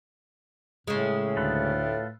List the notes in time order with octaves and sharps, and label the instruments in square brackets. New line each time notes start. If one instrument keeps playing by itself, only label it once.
[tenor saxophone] A2 [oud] C#3 G#3
[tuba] D2 [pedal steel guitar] F4 A4 B4